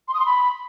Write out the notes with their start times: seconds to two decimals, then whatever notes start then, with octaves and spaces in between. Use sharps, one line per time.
0.08 C6
0.14 D#6
0.20 C6
0.26 B5